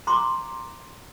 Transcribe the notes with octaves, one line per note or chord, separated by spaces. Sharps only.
A#5 C6 D6